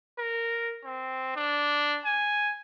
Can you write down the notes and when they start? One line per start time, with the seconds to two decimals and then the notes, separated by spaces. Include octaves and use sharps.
0.19 A#4
0.85 C4
1.36 D4
2.05 G#5